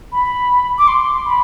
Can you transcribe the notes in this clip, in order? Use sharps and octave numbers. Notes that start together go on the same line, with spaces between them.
B5
D6
C6
B5